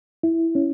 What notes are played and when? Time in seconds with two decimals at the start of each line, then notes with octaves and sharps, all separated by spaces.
0.23 E4
0.55 C#4